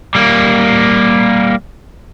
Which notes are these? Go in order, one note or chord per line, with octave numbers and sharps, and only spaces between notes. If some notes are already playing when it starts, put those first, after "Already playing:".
G3 A#3